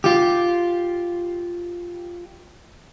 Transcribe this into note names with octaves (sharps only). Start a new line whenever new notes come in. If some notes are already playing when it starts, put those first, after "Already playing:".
F4 G4